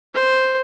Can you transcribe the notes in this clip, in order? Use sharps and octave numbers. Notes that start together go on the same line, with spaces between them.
C5